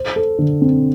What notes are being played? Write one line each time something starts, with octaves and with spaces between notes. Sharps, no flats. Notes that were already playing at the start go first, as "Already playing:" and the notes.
Already playing: C5
A4
D3
C4